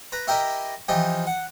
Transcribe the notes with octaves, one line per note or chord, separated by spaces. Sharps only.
B4 A#5
E4 G4 A#4 D#5 E5
E3 F3 D#4 G4
F#5